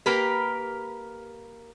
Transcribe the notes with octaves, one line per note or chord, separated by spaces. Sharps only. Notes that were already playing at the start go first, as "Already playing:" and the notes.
A#3 G4 A#4 B4